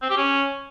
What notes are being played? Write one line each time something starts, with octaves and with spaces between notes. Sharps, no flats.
C4
G4
C#4